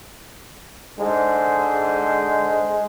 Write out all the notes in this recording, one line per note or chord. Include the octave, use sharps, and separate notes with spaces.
G#2 D3 G#3 C5